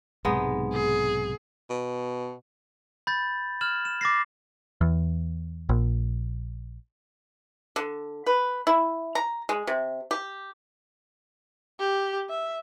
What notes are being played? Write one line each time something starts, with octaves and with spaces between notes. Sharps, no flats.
B1 G#2 C3 G#3 B3 D#4
G#4
B2
B5 G6 A6
F6 G#6 E7 F#7
E7
D6 A6 A#6 C7
E2
A#1
D3
B4
E4
A#5
G#3
C3
G4
G4
E5